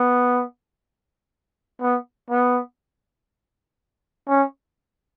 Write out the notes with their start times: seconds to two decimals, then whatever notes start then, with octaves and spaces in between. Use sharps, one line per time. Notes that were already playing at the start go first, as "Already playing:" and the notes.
Already playing: B3
1.81 B3
2.30 B3
4.28 C#4